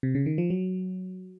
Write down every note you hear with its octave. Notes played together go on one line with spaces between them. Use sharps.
C3
C#3
D#3
F3
F#3